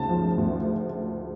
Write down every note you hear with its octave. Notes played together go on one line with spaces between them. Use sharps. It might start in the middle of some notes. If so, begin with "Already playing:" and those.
Already playing: D2 C#3 G#3 A5
F3
D2